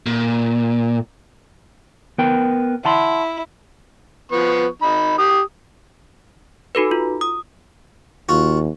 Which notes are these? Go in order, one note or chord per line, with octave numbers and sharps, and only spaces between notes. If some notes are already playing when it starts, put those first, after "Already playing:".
A#2
B3 A#4 G5
E4 F#5 A5 C6
F3 B3 C#6
D#3 D#4 B5
G4 D#6
D#4 F#4 A4 B4
F4
D#6
D#2 F4 F#4